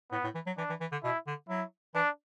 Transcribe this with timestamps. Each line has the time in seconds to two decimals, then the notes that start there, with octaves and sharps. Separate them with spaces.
0.12 A2 B3
0.24 A2
0.35 E3
0.47 F#3
0.58 E3 D4
0.70 E3
0.81 E3
0.92 D3
1.04 B2 E4
1.27 D3
1.49 F#3 E4
1.95 E3 D4